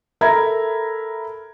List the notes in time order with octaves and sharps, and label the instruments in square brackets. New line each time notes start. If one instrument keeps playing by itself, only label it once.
[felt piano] A4 A#4 E5 A#5 B5 G#6